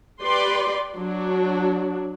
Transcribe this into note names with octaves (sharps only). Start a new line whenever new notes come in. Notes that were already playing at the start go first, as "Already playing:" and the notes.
G4 B4 D5 C6
F#3 D4 F#4